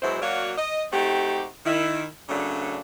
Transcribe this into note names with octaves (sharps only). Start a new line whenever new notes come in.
B2 F#3 G#3 E4 C5
F#3 A#3 F#4 C#5 D5 F5
D#5
A3 C4 D#4 F#4 G4
D#3 E4
C#3 F#3 A3 A#3 D4